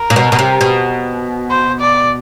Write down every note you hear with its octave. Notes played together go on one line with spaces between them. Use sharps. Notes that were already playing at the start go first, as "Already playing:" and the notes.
Already playing: A#4
A#2
B2
B2
C3
B2
C5
D5